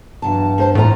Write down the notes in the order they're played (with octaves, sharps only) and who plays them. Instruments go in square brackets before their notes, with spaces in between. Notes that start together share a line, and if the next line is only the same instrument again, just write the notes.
[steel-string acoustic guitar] E2 F#3 A5 [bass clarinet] G2
[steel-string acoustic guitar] G#3 C5 A5
[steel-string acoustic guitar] E2 F4 A#5 [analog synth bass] A2